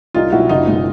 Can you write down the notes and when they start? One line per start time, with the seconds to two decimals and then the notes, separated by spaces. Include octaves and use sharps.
0.14 C2 D#4 F4
0.32 B2 F#3 E4 F#4
0.49 F#1 D#4 F4
0.67 B2 G#3